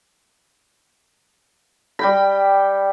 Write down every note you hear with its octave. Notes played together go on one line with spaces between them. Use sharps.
G3 G5 B5